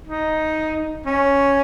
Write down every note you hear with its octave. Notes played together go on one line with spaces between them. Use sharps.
D#4
C#4